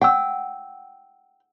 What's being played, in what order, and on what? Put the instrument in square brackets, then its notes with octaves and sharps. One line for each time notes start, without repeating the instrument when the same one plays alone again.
[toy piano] F#5 E6 [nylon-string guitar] G5